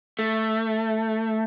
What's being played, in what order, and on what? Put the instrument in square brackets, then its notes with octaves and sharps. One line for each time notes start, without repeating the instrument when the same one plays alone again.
[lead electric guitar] A3